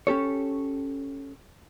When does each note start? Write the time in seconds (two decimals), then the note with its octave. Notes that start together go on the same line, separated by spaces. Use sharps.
0.07 C#4 G4 A4 C#5